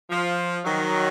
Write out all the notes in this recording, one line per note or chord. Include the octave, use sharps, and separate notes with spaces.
F3
D#3 F#3